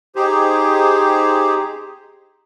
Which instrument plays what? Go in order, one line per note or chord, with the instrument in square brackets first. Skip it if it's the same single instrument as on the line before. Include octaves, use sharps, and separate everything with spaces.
[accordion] D#4 G4 G#4 C5